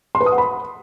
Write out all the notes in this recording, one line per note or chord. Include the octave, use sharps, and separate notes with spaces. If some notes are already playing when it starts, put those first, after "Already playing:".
C6
B4
D#6
F#5
B5